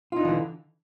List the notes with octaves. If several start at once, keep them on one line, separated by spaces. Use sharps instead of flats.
D3 E3 D4 D#4 F4